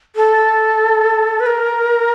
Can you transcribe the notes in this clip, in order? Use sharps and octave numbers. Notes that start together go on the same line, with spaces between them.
A4
B4
A#4